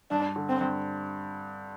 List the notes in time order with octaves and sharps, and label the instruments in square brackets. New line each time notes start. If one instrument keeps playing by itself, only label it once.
[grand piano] G2 [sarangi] D4
[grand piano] D3
[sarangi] C4
[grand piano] G2